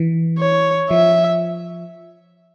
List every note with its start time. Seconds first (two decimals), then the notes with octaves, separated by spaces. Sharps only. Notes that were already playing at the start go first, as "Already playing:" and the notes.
Already playing: E3
0.38 C#5
0.90 F3 E5